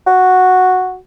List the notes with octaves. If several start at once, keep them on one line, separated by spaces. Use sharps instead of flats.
F#4